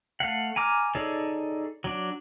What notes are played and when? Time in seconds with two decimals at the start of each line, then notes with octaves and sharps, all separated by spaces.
0.20 A3 F5 F#5
0.56 G#5 A#5 D6 F6
0.95 D#4 G#4 A4 C#5 D5
1.84 F#3 D4